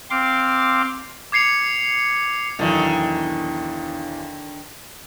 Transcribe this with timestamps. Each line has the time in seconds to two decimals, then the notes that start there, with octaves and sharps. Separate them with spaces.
0.10 C4 F5 C6 D6
1.32 D6 G#6 C7 C#7 F7
2.59 B1 E2 D3 D#3